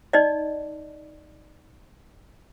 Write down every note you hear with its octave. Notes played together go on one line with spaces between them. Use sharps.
D#4 D5 D#5